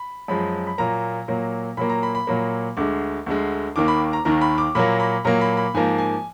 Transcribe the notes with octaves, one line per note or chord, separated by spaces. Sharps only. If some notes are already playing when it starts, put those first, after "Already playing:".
Already playing: B5
F#2 F3 G#3 B5
B5
A#2 F#3 A#3 A#5
A#2 F#3 A#3
A#2 F#3 A#3 B5
A#5
B5
B5
A#2 F#3 A#3
D2 D3 G#3 D6
D2 D3 G#3
D#2 D#3 A#3 D6
B5
A#5
D#2 D#3 A#3 A#5
B5
D6
A#2 F#3 A#3 B5
B5
A#2 F#3 A#3 A#5
B5
B5
G#2 F3 A#3 G#5
G#5